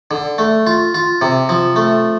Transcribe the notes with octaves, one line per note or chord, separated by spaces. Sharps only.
D3
A3
F4
F4
C3
F3
A3